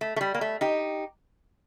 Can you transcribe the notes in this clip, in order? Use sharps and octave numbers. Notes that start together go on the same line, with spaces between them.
A3
A3
G3
A#3
A3
D#4 G4